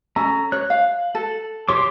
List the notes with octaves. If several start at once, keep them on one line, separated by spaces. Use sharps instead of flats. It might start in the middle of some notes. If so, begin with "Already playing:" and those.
C#4 A4 G#5 A#5
C#5 F#6
F5
A4
G4 C#5 C6 D6